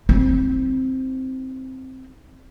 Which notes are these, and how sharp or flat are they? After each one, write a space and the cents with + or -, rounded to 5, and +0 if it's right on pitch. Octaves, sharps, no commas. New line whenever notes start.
C4 +0 D#4 +35